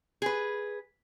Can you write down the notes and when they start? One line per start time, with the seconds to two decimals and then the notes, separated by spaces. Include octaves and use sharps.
0.22 G#4 B4